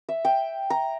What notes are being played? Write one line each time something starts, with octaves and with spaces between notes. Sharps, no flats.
E5
G5
A#5